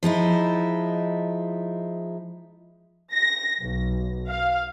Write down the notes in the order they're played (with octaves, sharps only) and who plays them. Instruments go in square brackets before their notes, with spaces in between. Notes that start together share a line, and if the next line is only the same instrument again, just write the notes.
[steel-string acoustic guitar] F3 G#3 D#4 E4
[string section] A#6
B1
F5